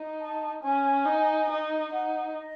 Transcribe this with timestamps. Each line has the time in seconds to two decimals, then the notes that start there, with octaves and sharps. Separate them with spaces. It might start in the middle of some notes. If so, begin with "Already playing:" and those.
Already playing: D#4
0.20 A5
0.62 C#4 G#5
1.05 D#4
1.49 D#4
1.92 D#4 F#5
2.35 D#5